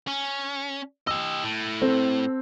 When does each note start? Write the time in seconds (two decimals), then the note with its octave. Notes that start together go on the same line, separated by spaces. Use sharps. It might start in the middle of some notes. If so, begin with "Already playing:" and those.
0.07 C#4
1.07 G4 D#5 E6
1.44 A2
1.81 C4 A4